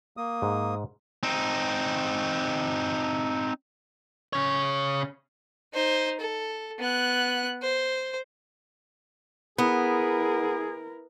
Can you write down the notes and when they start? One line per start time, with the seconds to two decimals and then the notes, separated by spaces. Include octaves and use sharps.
0.17 A#3 D#6
0.42 G#2
1.23 C4 D#4
4.33 C#3 C#5
5.74 D#4 C5
6.20 A4
6.79 B3 F#6
7.62 C5
9.58 B3 E4 G#4 A#4